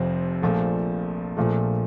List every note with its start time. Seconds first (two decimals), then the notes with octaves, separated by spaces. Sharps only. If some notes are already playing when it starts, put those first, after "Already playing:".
Already playing: F1 F2 C3 F3 C4
0.42 A#1 A#2 F3 A3
1.37 A#1 A#2 F3 A3